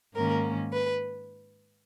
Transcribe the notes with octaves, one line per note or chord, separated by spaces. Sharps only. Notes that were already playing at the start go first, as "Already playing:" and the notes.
G#2 D#3 A#3 C#4 A#4
B4